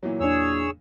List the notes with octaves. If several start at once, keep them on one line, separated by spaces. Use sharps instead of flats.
A#2 E3 F#3
E2 D4 G#4 C#5 E6